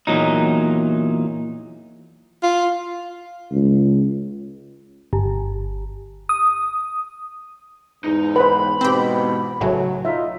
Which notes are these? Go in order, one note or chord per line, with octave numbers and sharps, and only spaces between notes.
E2 A#2 F#3 D#4
F4
C#2
G1
D#6
E2 G#2 D#4
B4 C5 B5
E2 G#2 B2 C4 G4
B1 A2 C#3 F#3
D#4 F4 E5